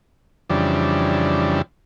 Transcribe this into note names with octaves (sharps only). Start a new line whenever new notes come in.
F2 C#3 E3 G3 D4